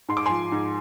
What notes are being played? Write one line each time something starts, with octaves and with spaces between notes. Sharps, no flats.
G#2 C6
D6
F3 G#5 C6
G#2